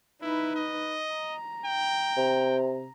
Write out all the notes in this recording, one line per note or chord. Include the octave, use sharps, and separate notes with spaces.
D#4 E4 B4
D#5
A#5
G5
C3